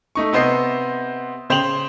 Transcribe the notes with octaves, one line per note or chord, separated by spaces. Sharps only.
A3 D#4 C#6
C3 B3 C5 D#5 C7
C#3 C5 G5 C6 F7 F#7